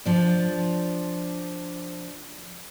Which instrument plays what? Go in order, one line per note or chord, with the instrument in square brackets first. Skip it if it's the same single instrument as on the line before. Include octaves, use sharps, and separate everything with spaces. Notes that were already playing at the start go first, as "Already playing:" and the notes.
[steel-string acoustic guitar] F3 D4